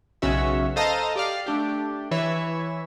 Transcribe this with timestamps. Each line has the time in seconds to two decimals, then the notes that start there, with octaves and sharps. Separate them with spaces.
0.22 B1 C#3 C#4 F#4 E5
0.76 A4 C5 D#5 F5 A5 A#5
1.16 G4 D5 F5
1.46 A3 D4 G4
2.11 E3 C#5 E5